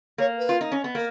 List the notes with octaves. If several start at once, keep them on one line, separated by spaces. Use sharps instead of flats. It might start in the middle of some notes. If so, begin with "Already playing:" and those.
A#3 C#5
B4
F4
D#4
C#4
B3
A#3 A#4